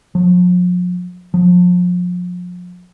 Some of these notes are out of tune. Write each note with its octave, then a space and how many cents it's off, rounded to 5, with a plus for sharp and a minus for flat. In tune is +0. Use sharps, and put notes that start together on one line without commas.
F3 +45
F3 +35